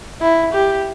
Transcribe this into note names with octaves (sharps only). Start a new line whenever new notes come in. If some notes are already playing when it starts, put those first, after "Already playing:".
E4
G4